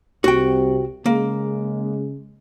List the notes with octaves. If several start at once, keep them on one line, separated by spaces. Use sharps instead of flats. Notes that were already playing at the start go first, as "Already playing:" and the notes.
C2 C3 F#4 G5
C#3 G#3 A#3